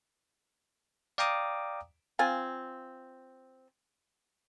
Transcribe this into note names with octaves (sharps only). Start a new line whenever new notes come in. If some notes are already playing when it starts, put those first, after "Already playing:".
D5 F5 G5 A#5 D6 D#6
C4 F4 G#5